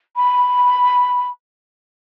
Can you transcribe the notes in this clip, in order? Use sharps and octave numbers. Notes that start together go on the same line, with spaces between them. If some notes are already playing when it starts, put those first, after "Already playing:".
B5